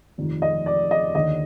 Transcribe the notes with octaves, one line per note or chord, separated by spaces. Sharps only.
F1 F2 D#3
D#5
D5
D#5
D#2 D3 D#5